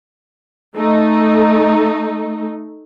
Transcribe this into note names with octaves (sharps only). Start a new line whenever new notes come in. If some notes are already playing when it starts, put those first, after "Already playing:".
A3 D#4